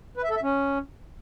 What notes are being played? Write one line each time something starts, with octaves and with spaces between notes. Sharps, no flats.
B4
E5
A4
E5
C#4